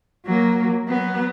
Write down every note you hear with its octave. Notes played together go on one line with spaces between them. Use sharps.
F#3 A#3
F#3 B3